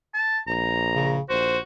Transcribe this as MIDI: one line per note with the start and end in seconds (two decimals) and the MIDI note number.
0.14 0.38 81
0.47 1.17 34
0.47 1.12 82
0.95 1.20 49
1.30 1.58 34
1.30 1.59 66
1.30 1.58 72